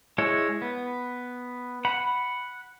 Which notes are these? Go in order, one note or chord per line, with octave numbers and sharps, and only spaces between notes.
G#3 E4 C#5
B3
F#5 B5